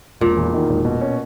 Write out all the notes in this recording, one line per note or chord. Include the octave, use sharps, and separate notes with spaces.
E1 A#2
E2
D#3
E1
B2
C#4